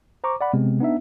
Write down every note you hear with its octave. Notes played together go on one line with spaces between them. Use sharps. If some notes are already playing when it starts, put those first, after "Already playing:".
C5 A#5 C#6 D6
D5 F#5 B5
C3 G#3 B3 C4
B3 D4 D#4 E5